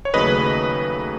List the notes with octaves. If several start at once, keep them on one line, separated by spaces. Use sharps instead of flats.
C#5
D#2 C#3 F#3 A3 B4 D#5